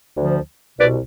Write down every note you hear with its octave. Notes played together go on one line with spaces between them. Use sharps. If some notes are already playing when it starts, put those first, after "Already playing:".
D2 D3 F3
C2 B2 B4 D5